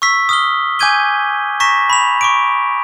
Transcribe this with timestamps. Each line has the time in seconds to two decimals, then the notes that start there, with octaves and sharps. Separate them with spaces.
0.02 C#6 E6 B6
0.29 D#6 F6 G7
0.79 G#5 D6 G6 G#6 D#7 G7
1.60 A#5 C#6 A#6 B6 E7
1.90 B5 F7
2.21 C#6 D6 D7